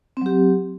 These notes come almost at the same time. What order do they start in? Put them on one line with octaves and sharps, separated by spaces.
C4 F#3 G4